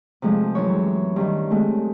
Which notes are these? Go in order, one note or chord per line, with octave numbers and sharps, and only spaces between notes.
C3 F3 G#3 A3
F#2 E3 C#5
G2 D#3
G#3 A3 C4